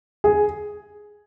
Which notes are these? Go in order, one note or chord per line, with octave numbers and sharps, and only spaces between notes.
G#4